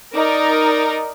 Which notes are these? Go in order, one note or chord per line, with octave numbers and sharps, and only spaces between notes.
D#4 A#4 D5